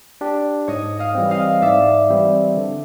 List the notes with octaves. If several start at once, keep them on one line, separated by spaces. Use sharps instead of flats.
D4 G4
G#2 C#5 D#5
D#5 F5
E3 G3 C4
D#5 F5
G#2 D5 E5
E3 G3 C4
D3